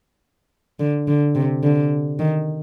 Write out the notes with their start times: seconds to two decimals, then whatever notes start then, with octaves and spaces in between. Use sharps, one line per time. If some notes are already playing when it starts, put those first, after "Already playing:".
0.79 D3
1.08 D3
1.35 C3
1.64 D3
2.19 D#3